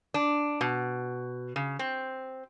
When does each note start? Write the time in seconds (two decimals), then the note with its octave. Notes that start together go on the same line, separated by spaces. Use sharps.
0.14 D4
0.61 B2
1.56 C#3
1.79 C4